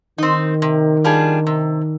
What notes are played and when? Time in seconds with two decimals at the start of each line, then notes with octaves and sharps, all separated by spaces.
0.18 D#3 C4 D#4
0.62 C3
1.04 G3 D4 F4 G#4
1.47 C3